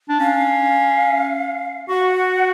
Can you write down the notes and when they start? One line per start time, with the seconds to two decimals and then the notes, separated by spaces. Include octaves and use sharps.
0.09 D4
0.20 C#4 F5
1.89 F#4 F#5